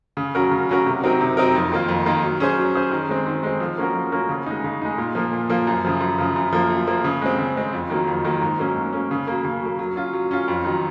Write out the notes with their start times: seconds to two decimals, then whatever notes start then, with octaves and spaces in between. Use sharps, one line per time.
0.17 C#3
0.35 F#3 C#4 F#4 A#4
0.51 C#3
0.69 F#3 C#4 F#4 A#4
0.86 C3
1.03 F#3 C4 D#4 A#4
1.21 C3
1.37 F#3 C4 D#4 A#4
1.55 F2
1.71 D#3 A#3 F4
1.88 F2
2.06 D#3 A#3 F4
2.24 F#3
2.40 C#4 G#4 C5
2.58 F#3
2.75 C#4 G#4 C5
2.91 D#3
3.09 G#3 C4
3.26 D#3
3.43 G#3 C4
3.60 F3
3.78 A#3 C#4 F#4 A#4
3.95 F3
4.12 A#3 C#4 F#4 A#4
4.29 C#3
4.46 G#3 D#4
4.64 C#3
4.82 G#3 D#4
4.98 A#2
5.15 F3 A#3
5.33 A#2
5.50 F3 A#3
5.67 F#2
5.85 C#3 F3
6.01 F#2
6.18 C#3 F3
6.36 F#2
6.53 F3 A#3
6.70 F#2
6.87 F3 A#3
7.04 C#3
7.21 G#3 C4
7.38 C#3
7.56 G#3 C4
7.73 F2
7.90 D#3 F#3 A#3
8.07 F2
8.25 D#3 F#3 A#3
8.41 G#2
8.58 F#3 A#3 C#4
8.75 G#2
8.93 F#3 A#3 C#4
9.11 C#3
9.27 F#3 A#3
9.45 C#3
9.62 F#3 A#3
9.79 F#3
9.96 C#4 F4
10.13 F#3
10.31 C#4 F4
10.48 F2
10.65 D#3 F#3